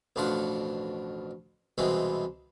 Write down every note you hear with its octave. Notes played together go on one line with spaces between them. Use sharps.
A1 F2 B2 D4 F4 F#5
C2 B2 E3 G#3 B3 C4